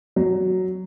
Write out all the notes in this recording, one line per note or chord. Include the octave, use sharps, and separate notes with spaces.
F#3